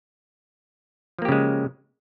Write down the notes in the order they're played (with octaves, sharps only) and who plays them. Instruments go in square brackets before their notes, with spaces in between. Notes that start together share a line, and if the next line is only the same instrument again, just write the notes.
[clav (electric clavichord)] F3
A#3
G4
C#3
G#3